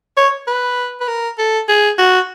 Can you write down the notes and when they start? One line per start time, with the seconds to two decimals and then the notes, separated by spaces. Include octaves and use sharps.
0.17 C#5
0.47 B4
1.00 B4
1.08 A#4
1.38 A4
1.68 G#4
1.98 F#4